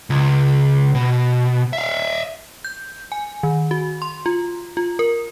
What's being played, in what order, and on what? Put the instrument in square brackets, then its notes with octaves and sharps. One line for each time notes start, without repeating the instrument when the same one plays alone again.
[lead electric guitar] C#2
B2
E5 F5
[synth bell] G6
G#5
D#3
F#4
C6
F4
F4
A#4